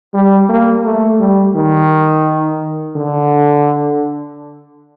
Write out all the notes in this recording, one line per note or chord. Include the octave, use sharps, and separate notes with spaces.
G3
A#3
A3
G3
D#3
D3